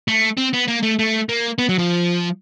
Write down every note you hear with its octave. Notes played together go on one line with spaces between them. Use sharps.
A3
C4
B3
A#3
A3
A3
A#3
B3
F#3
F3